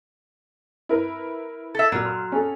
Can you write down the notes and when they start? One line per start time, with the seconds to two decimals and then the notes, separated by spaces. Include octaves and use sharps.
0.89 E4 A#4 B4
1.75 A4 E5
1.92 A#2 F#3 F6
2.05 C6
2.32 C#4 G#4 A4